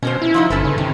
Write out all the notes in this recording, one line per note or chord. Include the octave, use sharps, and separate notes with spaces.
B2 C#4 A#4 C5
E4
F3 F#3 D#4
G1 C#4 A4 B4
C#3
C3 D#3